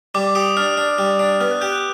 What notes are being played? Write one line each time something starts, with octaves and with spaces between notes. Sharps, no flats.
G3 D6
G4 D#6
D4 F6
D4
G3
D4
B3 F6
F#6
G4 G6
F#6